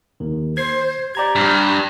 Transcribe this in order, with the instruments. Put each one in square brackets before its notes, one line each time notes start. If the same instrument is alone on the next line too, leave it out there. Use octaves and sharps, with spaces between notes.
[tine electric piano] D#2 D#3
[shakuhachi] C5 [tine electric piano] G#6 C7
[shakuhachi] G4 [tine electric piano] D5 A#5 G#6
[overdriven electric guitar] G2